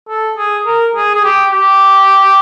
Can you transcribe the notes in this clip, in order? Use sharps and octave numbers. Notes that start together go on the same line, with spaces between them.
A4
G#4
A#4
G#4
G#4
G4
G4